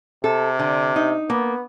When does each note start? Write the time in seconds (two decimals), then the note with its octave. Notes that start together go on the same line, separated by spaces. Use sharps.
0.24 C3 A4
0.59 D3
0.96 D#4
1.30 A#3 B3